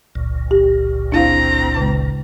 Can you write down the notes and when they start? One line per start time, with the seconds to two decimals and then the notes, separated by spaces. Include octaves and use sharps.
0.15 G1 C#2 A#2
0.51 G4
1.12 C4 D4 E4 F5 A#5
1.76 C#3 G#3